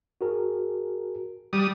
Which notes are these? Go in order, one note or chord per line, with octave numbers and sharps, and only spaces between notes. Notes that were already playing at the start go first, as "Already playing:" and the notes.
F#4 G#4 A#4
G3 D#6